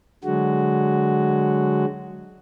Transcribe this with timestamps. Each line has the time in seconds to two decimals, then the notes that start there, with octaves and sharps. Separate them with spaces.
0.24 D3 F#3 G#3 F#4